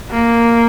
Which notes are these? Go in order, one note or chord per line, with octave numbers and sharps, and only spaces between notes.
A#3